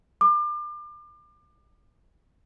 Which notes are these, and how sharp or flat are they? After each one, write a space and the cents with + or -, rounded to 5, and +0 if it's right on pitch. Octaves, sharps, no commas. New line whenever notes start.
D6 +35